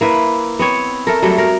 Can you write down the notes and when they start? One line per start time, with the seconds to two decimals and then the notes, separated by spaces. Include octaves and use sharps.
0.01 A#3 E4 B4
0.59 B3 C4 C#5
1.07 A3 A4 A#4
1.22 F#3 G3 A3
1.38 A#4